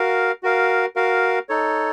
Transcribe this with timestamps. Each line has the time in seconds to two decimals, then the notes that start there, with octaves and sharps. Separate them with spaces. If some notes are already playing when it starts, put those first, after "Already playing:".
Already playing: F#4 A#4 F5
0.43 F#4 A#4 F5
0.96 F#4 A#4 F5
1.49 D#4 A4 C#5